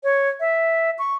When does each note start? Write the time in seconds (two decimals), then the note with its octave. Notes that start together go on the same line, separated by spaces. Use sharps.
0.04 C#5
0.40 E5
0.99 C#6